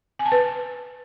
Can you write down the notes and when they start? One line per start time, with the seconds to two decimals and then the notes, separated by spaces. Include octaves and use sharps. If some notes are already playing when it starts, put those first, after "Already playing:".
0.19 G#5
0.26 A5
0.32 B4